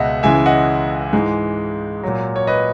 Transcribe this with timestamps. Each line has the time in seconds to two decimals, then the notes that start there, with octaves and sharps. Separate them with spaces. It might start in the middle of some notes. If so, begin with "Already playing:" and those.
Already playing: C#2 B2 G#3 D#5 E5 F#5
0.23 C#2 C#3 E3 G#3 E5 G#5
0.46 D#5 F#5
1.13 G#2 E3 G#3
2.03 A#2 F#3
2.36 C#5
2.47 B4 D#5